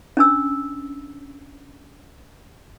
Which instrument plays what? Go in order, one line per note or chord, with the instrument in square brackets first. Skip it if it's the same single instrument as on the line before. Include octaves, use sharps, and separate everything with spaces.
[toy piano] C#4 D4 E6